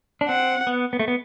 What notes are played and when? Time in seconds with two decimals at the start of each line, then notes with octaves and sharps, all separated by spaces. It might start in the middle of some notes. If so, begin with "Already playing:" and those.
0.21 D4
0.29 C4 F#5
0.67 B3
0.93 B3
0.99 A3
1.08 B3